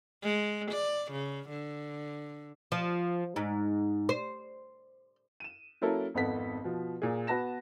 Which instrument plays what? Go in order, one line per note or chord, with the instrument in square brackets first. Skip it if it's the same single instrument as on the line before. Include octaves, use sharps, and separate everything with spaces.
[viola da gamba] G#3
D5
C#3
D3
[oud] F3
G#2
C5
[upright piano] D#7 E7
F#3 A#3 C#4 E4 A4 A#4
G#1 F2 B3 A4 B6
B2 F3
A#2 G#4
B3 F#4 B4 A5 A#6 E7